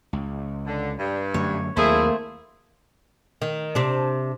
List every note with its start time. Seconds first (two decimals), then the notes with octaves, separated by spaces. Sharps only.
0.13 C#2
0.67 D3
0.99 G2
1.34 F#2 D3 A3 C#5
1.77 D#2 F#3 A3 A#3 C4 E4 G#4
3.42 D#3
3.75 C3 D4